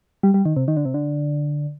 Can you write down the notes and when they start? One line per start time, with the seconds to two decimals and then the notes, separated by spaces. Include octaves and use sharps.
0.23 G3
0.34 G3
0.45 D#3
0.57 C3
0.68 D#3
0.77 D3
0.85 C3
0.94 D3